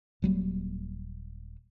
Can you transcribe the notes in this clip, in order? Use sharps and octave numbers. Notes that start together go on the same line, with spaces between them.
D#1 F#3 G3 A#3